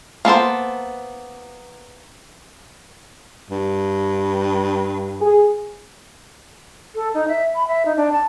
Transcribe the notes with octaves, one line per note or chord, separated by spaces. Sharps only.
A#3 B3 A4 C5
G2
G#4
A4
D#4
E5
B5
E5
D#4
D4
A5